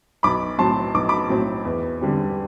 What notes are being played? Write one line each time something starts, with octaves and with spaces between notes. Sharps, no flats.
B1 B5 D6
A2 F#3 C4 A5 C6
B1 D6
B5 D6
A2 F#3 C4
E2
D3 G3 C4